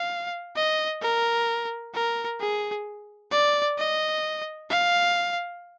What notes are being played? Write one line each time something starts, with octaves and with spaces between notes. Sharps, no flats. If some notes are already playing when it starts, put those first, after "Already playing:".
Already playing: F5
D#5
A#4
A#4
G#4
D5
D#5
F5